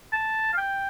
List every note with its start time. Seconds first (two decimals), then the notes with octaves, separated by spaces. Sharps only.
0.13 A5
0.53 F5
0.57 G5